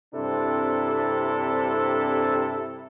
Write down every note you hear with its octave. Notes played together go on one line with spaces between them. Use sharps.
G2 C3 C4 D4 E4 A4